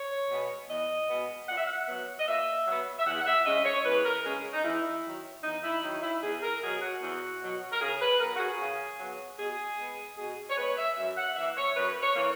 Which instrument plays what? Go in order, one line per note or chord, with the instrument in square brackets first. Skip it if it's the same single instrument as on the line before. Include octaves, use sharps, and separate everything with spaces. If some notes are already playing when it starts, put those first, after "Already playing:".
Already playing: [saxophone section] C#5
B2 G#3 B3
E2 D#5
B2 G#3 B3
A#2 F#5
E5
F#5
F#3 B3
D#5
A#2 E5
F#3 B3
E5
E2 F#5
F#5
E5
C#3 G#3 C#4 D#5
C#5
E2 B4
A#4
C#3 G#3 C#4 G#4
D#4
E2 E4
D#3 F#3
E2 D#4
E4
D#3 F#3 D#4
E4
E2 G#4
A#4
B2 F#3 G#4
F#4
E2
B2 F#3
A#4
C#3 G#4
B4
F#3 B3 A#4
F#4
G#4
C#3
F#3 B3
B2 G#4
G#3 B3
B2 G#4
C#5
G#3 B3 B4
E5
F#2 E5
F#5
E3 A#3 E5
C#5
F#2 B4
C#5
E3 A#3